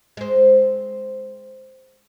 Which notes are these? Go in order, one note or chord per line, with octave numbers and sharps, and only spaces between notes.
G#3 C4